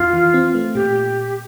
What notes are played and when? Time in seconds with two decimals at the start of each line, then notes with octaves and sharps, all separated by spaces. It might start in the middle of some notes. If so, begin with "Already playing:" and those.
Already playing: F2 F4
0.13 E3
0.34 C4
0.55 A3
0.75 A#2 G4